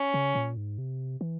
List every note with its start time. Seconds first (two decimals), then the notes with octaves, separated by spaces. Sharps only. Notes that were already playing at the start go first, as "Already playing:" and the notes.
Already playing: C#4
0.14 C#3
0.35 A#2
0.57 G#2
0.78 C3
1.21 E3